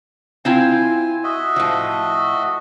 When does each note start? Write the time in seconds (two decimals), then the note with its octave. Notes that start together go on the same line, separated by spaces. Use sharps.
0.45 C4 E4 F4 G#5
1.24 F#4 D#5 E5
1.56 A2 F3